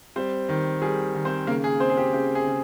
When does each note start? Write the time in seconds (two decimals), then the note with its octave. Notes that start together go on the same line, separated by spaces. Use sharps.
0.16 G3 C4 C5
0.49 D#3
0.82 G3 G#4
1.15 D#3
1.25 C4 C5
1.47 C#3 A#3 A#4
1.64 G#4
1.80 C4 C5
1.90 G#4
1.97 G4
2.13 C#3 G4
2.35 G#4
2.46 C#3